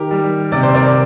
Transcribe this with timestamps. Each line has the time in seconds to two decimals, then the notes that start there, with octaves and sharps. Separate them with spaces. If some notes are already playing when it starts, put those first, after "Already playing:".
Already playing: D#3 G4 A#4
0.11 G3
0.52 C3 D5
0.63 C5
0.74 A#4 D5